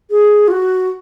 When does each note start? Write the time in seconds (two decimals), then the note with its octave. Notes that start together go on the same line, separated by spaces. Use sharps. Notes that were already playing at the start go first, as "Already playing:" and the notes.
0.10 G#4
0.48 F4
0.51 F#4